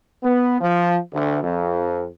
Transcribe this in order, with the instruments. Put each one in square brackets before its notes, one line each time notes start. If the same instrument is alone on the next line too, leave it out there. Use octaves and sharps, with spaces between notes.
[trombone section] B3
F3
D2
F2